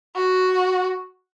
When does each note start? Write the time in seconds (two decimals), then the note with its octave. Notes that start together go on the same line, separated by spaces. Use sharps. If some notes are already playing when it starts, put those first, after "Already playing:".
0.16 F#4